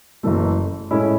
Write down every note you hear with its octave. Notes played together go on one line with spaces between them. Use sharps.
F#1 F#2 E3 A3
A2 G#3 C#4 E4 A4